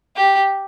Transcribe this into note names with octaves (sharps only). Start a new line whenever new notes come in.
G4